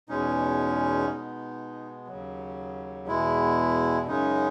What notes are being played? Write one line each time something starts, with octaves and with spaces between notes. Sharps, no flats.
E2 B2 G#3 C#4 D#4
B2 G#3 B3
D#2 C#3 F#3
E2 B2 G#3 E4
F#2 C#3 G#3 C#4 D#4